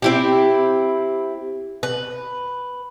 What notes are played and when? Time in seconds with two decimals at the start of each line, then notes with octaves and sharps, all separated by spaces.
0.02 C4 E4 G4
1.83 B4